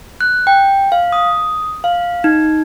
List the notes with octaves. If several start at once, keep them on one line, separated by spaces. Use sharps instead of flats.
F#6
G5
F5
D#6
F5
D#4